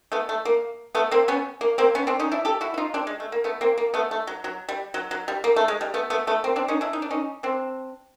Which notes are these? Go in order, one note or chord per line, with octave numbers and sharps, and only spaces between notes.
A3 B3
A3
A#3
A3 B3
A#3 C4
B3 C#4
A#3
A#3 C4
B3 C#4
C4 D4
C#4 D#4
D4 E4
G4 A4
E4 F#4
E4
D#4 F4
C4 D4
G#3
A3
A#3
A3 B3
A#3 C4
A#3
A3 B3
A3
F#3
F#3
G3
F#3
F#3
G3
A#3
A3
G#3
G3
A3 B3
A3 B3
A3 B3
A#3 C4
C4 D4
C#4 D#4
D4 E4
D#4
D4
C#4 D#4
C4 D4